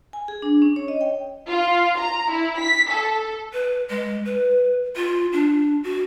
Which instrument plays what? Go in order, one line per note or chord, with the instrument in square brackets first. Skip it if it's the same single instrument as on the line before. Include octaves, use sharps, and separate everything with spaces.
[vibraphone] G#5
G#4
D4
C#4
C#5
D#5
G5
[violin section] F4
A#5
E4
B6
A4
[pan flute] B4
G#3
B4
F4
D4
F#4